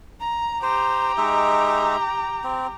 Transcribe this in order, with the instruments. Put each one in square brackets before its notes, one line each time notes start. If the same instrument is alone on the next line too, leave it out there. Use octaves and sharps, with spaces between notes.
[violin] A#5
[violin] G4 A#5 [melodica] C5
[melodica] G#3 D#4 E5
C4